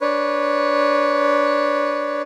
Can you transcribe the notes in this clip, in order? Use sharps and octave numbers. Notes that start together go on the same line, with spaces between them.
D4 B4 C#5